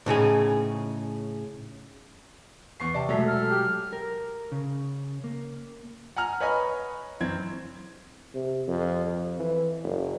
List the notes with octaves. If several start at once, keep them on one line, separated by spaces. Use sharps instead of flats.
A2 C#3 D#4 G#4
E2 C#6 C7
C3 D5 A5
B2 F#3 G#3 A3 A4 E5
A4 F6
G4
A#4
C#3
A#3
F#5 G#5 A#5 F6
B4 C#5 D#5 G#5 A#5 B5
F#2 E3 C4 G#6
C3
F2
F2
E3
F#1